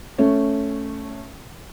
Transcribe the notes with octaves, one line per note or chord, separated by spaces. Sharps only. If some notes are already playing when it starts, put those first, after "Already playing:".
A3 C#4